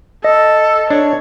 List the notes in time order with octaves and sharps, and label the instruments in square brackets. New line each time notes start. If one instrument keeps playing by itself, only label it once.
[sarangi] A4 [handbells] D#5
[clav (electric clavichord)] D4 [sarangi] C#5